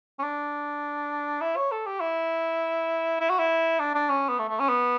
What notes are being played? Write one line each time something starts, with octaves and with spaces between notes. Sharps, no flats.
C#4
D4
E4
C#5
A4
G4
E4
E4
F#4
E4
D4
D4
C#4
B3
A3
A3
C#4
B3